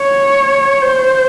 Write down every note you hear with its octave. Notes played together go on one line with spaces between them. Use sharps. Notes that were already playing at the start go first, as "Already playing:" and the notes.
Already playing: C#5
C5